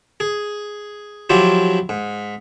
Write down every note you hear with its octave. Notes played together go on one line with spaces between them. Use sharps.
G#4
F3 F#3 E4 F4 G4
G#2